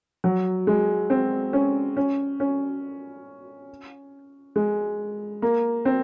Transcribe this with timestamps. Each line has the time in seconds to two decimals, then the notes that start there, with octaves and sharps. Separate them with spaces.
0.24 F#3
0.67 G#3
1.10 C4
1.53 C#4
1.97 C#4
2.40 C#4
4.56 G#3
5.42 A#3
5.85 C4